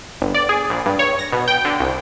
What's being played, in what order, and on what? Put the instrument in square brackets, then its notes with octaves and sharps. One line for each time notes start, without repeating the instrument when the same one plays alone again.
[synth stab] G1
D5
G#4
A#1
G2
C#5
A#6
B2
G5
D3
C2